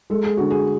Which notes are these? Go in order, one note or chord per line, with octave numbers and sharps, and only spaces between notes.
G#3 A4
G#4
D3 F#4
G#4